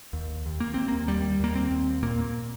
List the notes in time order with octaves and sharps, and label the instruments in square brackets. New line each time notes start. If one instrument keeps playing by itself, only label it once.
[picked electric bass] D#2
D#2
A#3
D#2 C4
A#3
D#2 G3
D#2 A#3
C4
D#2
A#2 A#3